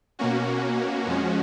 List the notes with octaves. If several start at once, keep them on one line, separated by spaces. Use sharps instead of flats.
B2 A#3 C#4 F#4
F2 F3 G#3 C#4